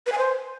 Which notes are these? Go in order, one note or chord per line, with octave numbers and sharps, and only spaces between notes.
B4
G#5
C5